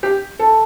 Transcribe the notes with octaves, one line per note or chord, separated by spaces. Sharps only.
G4
A4